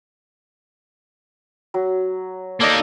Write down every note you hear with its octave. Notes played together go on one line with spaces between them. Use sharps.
F#3
A#3 D#4 A4 D5 D#5